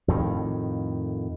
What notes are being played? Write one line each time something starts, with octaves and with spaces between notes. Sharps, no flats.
F2 A2 D#3